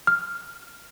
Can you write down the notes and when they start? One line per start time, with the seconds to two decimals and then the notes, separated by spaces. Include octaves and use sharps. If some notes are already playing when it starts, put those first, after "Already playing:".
0.07 F6